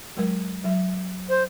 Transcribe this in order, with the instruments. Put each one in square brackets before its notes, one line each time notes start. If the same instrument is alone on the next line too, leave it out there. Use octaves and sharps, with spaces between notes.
[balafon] F#3 G#3 A#4
F#3 E5
[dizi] C5